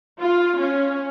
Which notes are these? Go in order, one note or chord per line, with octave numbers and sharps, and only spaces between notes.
F4
C#4